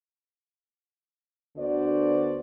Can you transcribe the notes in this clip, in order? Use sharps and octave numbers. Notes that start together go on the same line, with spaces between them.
D2 D3 B3 F#4 C5 D5